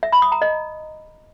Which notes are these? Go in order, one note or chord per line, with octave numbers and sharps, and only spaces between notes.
E5
B5
D#6
A#5
D#5